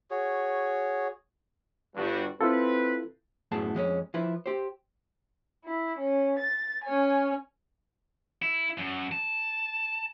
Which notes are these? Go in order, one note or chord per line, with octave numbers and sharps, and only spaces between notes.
F#4 G#4 C#5
G1 G2 F#4
C4 E4 F4 A4 B4
F#2 A2 B3 G#4 A5
F2 G#3 B3 C#4
F3 E4 B4
G4 C5
E4
C#4
A6
C#4 C#5 G#5
E4
F#2
A5